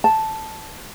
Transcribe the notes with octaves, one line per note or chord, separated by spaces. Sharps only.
A5